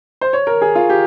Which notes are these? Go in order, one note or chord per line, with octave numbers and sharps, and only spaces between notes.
C5
C#5
A#4
G#4
F4
G4